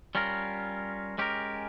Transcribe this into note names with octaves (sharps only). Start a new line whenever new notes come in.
G3 C#4 F4 A#4
G#3 C#4 G4 A#4